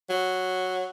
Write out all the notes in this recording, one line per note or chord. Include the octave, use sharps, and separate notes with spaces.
F#3